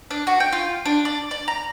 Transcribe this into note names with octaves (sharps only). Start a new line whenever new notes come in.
D4
F#4
G5
F4
D4
D5
D5
A#5